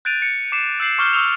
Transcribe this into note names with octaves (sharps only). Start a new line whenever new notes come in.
F#6 G6 A6 D7 D#7 F7
C#7
D6 C7 E7
E6 G6 C7 F#7
C#6 D6 F6 G6 C7 G7
C#6 E6 F6 F7